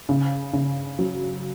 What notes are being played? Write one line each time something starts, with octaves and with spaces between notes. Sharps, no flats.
C#3
C#3
F#3